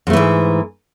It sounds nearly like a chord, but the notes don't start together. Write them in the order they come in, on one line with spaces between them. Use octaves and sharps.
F2 A3 E3 G#2